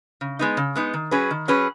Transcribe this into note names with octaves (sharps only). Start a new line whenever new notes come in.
C#3
G#3 B3 D#4
C#3
G#3 B3 D#4
D#3
F#3 C#4 G#4 B4
D#3
F#3 C#4 G#4 B4